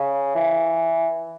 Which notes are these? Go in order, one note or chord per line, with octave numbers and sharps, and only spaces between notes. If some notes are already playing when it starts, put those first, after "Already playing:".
Already playing: C#3
E3